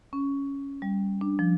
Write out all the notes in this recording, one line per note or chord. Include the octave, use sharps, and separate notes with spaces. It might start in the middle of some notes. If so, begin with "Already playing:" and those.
C#4
G3
D4
F3